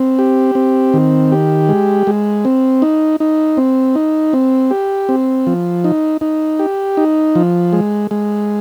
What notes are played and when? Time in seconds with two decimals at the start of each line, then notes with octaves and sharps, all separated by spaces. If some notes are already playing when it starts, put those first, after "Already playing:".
Already playing: C4
0.19 G4
0.55 C4
0.94 D#3
1.32 G4
1.69 G#3
2.07 G#3
2.45 C4
2.82 D#4
3.20 D#4
3.57 C4
3.95 D#4
4.33 C4
4.71 G4
5.09 C4
5.47 F3
5.84 D#4
6.21 D#4
6.59 G4
6.97 D#4
7.35 F3
7.73 G#3
8.11 G#3